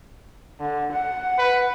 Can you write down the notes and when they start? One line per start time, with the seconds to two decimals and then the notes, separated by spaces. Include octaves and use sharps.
0.60 D3
0.92 F#5
1.39 B4